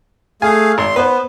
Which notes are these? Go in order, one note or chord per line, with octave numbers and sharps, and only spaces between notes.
A3 G#4 F5 G#5
G#1 C6
B3 B4 C5